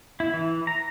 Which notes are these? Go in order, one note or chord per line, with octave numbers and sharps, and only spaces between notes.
E4
E3
A#5